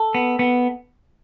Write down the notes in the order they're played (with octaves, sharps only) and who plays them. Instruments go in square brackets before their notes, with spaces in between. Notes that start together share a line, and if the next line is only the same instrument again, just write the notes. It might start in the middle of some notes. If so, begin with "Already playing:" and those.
Already playing: [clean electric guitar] A4
B3
B3